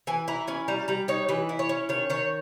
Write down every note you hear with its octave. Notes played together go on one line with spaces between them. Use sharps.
E3 G#5
E4 A#5
C#4 G#5
G3 A#5
G3 A#5
D#4 C#5
E3 B4
E4
C#5
C#4
D#3 C#5
D#3 C#5